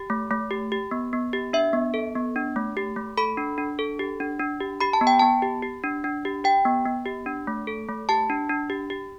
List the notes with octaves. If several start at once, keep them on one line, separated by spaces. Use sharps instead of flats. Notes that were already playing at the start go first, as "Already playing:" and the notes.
Already playing: G4
A3
A3
G4
G4
B3
B3
G4
D4 E5
B3
A4
B3
D4
A3
G4
A3
A4 B5
D4
D4
A4
G4
D4
D4
G4
G4 B5
A5
B3
G5
B3 A5
G4
G4
D4
D4
G4
G4 G5
B3
B3
G4
D4
A3
A4
A3
G4 A5
D4
D4
G4
G4